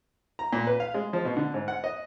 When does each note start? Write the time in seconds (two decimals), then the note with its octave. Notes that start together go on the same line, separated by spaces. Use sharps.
0.39 A#5
0.53 A#2
0.67 B4
0.80 F5
0.94 G#3
1.13 F3
1.25 B2
1.37 D3
1.54 G#2
1.68 F#5
1.84 D#5